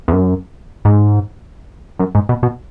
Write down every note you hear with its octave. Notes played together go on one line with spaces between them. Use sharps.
E2
F#2
G#2
F#2
G#2
B2
B2